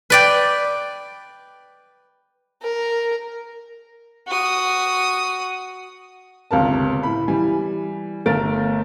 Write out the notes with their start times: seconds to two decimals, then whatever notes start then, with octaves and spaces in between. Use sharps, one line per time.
0.10 B4 D5 G5
2.62 A#4
4.28 F#4 D#6
6.51 G1 C#2 C3 A#4 A5
7.03 A2 B5
7.28 E3 G3 G#5
8.26 G1 A3 A#4 A6 D7